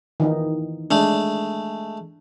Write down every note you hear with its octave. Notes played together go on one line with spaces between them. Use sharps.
D#3 E3 D#4
G#3 A3 D4